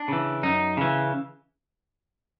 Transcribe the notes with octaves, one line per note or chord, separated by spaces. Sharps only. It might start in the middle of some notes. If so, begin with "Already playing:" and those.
Already playing: D4
C#3 E3
F#2 D#4
C#3 E3